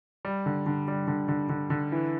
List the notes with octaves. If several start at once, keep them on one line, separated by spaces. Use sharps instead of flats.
G3
D3
D3
G3
D3
D3
D3
D3
E3